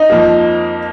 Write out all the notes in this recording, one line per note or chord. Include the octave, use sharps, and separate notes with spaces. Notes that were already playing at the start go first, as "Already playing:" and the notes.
Already playing: D#4
F2 F3 A#3